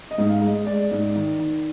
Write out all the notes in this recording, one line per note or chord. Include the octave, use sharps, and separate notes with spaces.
D#5
G#2
F5
G#3
D#5
G#3 D5
G#2
D#3
D#3